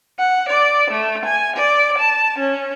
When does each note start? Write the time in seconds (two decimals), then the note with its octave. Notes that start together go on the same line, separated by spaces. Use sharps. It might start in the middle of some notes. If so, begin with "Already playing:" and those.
0.19 F#5
0.48 D5
0.90 A3
1.25 G#5
1.56 D5
1.98 A5
2.39 C#4